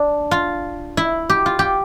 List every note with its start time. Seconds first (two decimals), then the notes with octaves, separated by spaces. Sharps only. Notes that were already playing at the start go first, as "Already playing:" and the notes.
Already playing: D4
0.31 F4
0.97 E4
1.30 G4
1.46 F4
1.59 G4